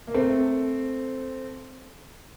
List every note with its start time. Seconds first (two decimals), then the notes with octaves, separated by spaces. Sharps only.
0.07 A#3
0.14 A3 C4